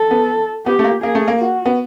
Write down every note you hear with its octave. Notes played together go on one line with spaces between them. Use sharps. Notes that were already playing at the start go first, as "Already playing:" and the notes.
Already playing: A4
B3
B3 G4
A3
A#3
A#3 G#4
A3
A#3
F#4
B3